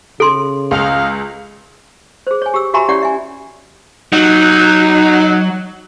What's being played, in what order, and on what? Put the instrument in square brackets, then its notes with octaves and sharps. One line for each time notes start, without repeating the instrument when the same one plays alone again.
[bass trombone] C#3 [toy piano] A4 C6
[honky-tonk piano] C#2 [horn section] D#5 F5
[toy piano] G#4 C5
C#5 G#5
G4 E6
F#4 G4 E5 G#5 A#5 B5
C#4 E4 G4 C#5 D5 F#5
E5 G#5
[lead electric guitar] F#3 [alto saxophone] D#4